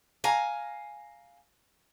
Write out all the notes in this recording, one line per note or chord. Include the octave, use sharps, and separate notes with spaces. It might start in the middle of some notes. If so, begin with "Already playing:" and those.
F5 G#5 A#5